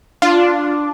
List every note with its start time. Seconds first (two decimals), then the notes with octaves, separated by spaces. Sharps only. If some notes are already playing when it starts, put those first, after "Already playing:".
0.22 D4 F4